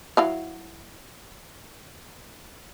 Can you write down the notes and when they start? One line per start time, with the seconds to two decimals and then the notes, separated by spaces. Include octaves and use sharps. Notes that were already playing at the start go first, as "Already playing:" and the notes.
0.17 F#3 E4 F5